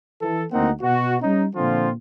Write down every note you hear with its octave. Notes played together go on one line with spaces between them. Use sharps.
E3 A4
D2 A#3 C4 D#4 F#5
B2 F#4
G3 C#4 D#4
A#2 D3 F3 C4 F4